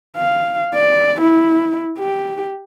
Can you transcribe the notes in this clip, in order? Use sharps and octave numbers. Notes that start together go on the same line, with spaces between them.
F5
D5
E4
G4